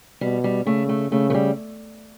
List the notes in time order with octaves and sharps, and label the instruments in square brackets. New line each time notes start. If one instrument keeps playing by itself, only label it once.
[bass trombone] B2 [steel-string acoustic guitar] G3
[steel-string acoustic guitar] G3
[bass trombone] C#3 [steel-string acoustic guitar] A3
[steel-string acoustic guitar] A3
[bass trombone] C#3 [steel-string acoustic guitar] A3
[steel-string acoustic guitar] A3
G3